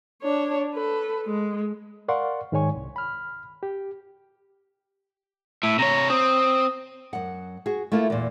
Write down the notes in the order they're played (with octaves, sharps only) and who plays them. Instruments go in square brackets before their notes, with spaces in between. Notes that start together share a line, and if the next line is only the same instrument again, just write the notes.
[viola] D4 C#5
A4 B4
G#3
[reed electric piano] A#4 D5 F5 F#5 C6 C#6
G#2 D#3 G#3 C#5 G#5 C#6
C2
B5 F6
G4
[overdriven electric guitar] A2 [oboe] E5
[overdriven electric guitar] C3 C#5 [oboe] A#5
[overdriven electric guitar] C4 [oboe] D#6
[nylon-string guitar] F#2 F#5
F#4 G#4
A3 A#3 E4 F4
E2 A#2